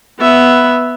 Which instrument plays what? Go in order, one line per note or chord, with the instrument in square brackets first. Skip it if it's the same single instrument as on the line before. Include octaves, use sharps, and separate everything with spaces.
[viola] B3 E5